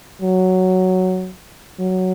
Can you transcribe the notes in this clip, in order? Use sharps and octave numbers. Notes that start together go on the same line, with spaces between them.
F#3
F#3